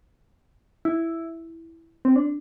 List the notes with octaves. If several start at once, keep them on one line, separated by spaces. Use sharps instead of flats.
E4
C4
D4